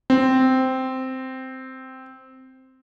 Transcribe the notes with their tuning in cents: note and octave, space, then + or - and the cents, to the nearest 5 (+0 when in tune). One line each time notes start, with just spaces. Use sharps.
C4 -5